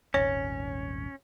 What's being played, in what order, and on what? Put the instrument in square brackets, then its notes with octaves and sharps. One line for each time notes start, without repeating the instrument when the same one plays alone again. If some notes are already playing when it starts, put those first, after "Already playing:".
[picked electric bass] D#1 G#1 [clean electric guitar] C#4 [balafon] C#5